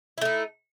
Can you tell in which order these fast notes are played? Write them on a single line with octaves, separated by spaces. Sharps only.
E4 A3 D#4